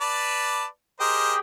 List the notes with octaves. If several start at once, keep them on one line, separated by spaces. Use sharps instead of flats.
B4 D5 A5
G4 G#4 A#4 C5 D#5 G5